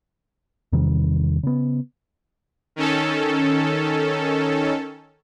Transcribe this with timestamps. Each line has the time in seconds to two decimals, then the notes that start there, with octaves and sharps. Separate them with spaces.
0.72 E2 C3 D#3 G3
1.43 C#3 B3
2.76 D#3 C#4 A4